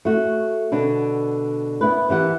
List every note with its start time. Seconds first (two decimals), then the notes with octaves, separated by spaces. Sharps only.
0.05 A3 F#4
0.72 B2 D3 D4
1.81 B3 E4 B4
2.09 D#2 E3 G4 F#5